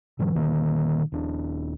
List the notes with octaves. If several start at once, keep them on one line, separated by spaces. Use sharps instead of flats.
G#2 D3 E3 F#3
A#2 D3 D#3 A#3
D#1 D4